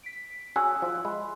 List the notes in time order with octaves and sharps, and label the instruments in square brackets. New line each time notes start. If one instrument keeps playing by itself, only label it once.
[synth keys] B6 D7
[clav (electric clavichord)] C#4 F#4 G#4 [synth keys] G#5 E6 F#6
[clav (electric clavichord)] F3
[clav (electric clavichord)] G#3 [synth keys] B5 C6